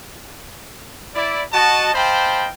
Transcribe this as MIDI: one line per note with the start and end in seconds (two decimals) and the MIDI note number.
1.15 1.42 64
1.15 1.42 74
1.53 1.90 66
1.53 1.90 75
1.53 1.90 81
1.94 2.47 72
1.94 2.47 75
1.94 2.47 77
1.94 2.47 79
1.94 2.47 81
1.94 2.47 83